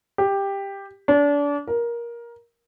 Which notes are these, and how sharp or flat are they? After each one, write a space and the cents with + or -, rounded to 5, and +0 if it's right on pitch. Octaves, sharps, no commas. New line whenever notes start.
G4 +10
D4 -30
A#4 +15